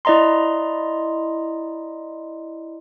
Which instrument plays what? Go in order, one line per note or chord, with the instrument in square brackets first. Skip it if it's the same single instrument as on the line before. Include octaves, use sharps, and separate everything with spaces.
[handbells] E4 D5 D#5 A#5 C6